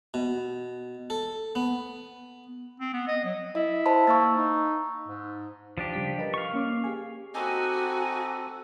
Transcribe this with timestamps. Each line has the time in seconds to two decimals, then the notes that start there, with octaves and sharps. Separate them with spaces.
0.14 B2
1.10 A4
1.55 B3
2.80 C4
2.93 B3
3.08 D#5
3.24 F#3
3.55 E4 D#5
3.86 C5 A5 B5
4.07 A#3 C#6 E6 A6
4.36 D#4
5.08 G#2
5.78 F3 D4 G4
5.94 C#3 G3 B6
6.18 A#4 B4 D#5
6.34 F5 C#6
6.53 A#3 C#4 D6
6.84 G4 G#4 G#5
7.34 C4 D#4 F#4 G4 A4 D#5 G#5